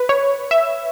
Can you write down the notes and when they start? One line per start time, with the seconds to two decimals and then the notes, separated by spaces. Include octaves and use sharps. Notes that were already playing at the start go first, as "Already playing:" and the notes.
Already playing: B4
0.09 C#5
0.51 E5